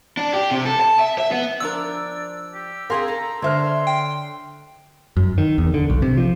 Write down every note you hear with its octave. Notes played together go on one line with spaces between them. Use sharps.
D4
G4
C3
A4
A5
E5
E5
B3
F3 D4 A#4 D5 E6
G4
C4 G#4 A#4 F5 C6
A4 A#5
D3 C5 C#5 E5 C6 F6
G5
F#2
D#3
E2
D3
B1
C3
F3